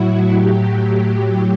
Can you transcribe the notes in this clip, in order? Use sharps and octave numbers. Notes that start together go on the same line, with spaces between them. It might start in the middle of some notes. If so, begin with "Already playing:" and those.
Already playing: A2 F#3 E4 F#4
A2 F#3 G4